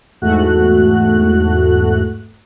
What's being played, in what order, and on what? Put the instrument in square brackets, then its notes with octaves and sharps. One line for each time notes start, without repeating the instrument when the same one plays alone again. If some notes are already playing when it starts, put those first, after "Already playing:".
[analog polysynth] E2 G#2 A3 F#4 F#6